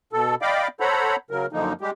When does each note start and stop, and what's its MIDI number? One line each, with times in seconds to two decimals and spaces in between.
0.13 0.35 47
0.13 0.35 69
0.42 0.68 74
0.42 0.68 75
0.42 0.68 77
0.42 0.68 79
0.42 0.68 83
0.42 0.68 86
0.80 1.16 69
0.80 1.16 72
0.80 1.16 73
0.80 1.16 78
0.80 1.16 82
0.80 1.16 83
1.31 1.46 49
1.31 1.46 54
1.31 1.46 70
1.53 1.73 42
1.53 1.73 50
1.53 1.73 53
1.53 1.73 58
1.53 1.73 63
1.81 1.91 55
1.81 1.91 56
1.81 1.91 67